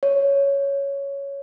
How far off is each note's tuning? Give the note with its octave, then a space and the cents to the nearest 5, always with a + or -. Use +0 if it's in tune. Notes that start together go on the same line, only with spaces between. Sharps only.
C#5 +5